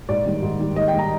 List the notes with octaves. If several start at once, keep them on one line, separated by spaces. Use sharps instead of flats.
G#2 D5
D#3 G3
G#2
D#3 G3
G#2 D#5
G5
D#3 G3
A#5